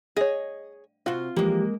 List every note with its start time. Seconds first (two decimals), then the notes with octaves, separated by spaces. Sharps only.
0.17 G#4 C#5 D#5
1.06 C3 F4 F#4
1.37 E3 F3 G#3 A#3 G4